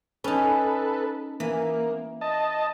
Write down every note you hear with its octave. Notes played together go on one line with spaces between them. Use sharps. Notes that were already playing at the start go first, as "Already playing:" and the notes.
C#4 D#4 A4 B4
E3 A#3
D#5 A5